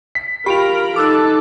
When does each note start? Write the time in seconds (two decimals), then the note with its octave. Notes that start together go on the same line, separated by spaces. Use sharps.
0.15 B6
0.46 F4 G4 A#4 G5 B5 D7 F7
0.96 D#4 A4 D6 E6 F#6